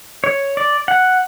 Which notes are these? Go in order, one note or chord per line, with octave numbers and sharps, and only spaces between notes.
C#5
D5
F#5